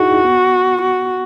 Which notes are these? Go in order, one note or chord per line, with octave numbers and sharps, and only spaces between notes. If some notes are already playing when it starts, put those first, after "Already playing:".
Already playing: D#4 E4 F#4 G#4
B3
F#4